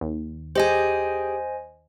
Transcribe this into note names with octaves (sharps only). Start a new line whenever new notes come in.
D#2
G4 G#4 C5 D#5 G#5